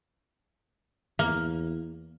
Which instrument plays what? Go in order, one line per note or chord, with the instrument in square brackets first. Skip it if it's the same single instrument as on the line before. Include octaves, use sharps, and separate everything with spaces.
[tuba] E2 [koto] A#3